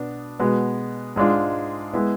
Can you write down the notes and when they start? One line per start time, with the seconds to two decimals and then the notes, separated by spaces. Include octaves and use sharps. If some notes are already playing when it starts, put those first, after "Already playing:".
Already playing: B2 B3 D4
0.40 B2 G#3 B3
1.16 G#2 G#3 D4 F4
1.93 G#3 B3 E4